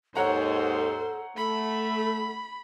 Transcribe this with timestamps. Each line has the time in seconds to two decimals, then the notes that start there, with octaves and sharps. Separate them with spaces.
0.16 D#2 G#2 A4 C5 C#5 F#5 A#5
1.37 A3 A4 B5